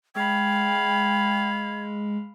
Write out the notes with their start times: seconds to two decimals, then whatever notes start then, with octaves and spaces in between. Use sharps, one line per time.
0.15 G#3 F5 G5 B5 G#6